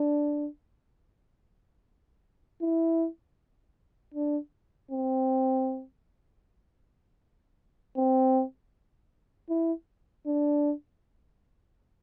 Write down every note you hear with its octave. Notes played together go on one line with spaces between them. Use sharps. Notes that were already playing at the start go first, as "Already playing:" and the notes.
Already playing: D4
E4
D4
C4
C4
E4
D4